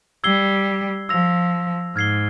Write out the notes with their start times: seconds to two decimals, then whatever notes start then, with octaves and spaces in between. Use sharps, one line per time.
0.24 G3 E6 G#6 C7 G7
1.09 F3 E6 A#6 F7
1.96 G#2 F6 G#6 C7 G7